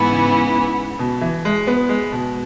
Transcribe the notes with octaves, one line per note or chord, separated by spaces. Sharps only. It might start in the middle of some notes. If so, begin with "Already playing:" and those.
Already playing: G#2 E3 B3 E4
C#3
B2
E3
G#3
B3
G#3
B2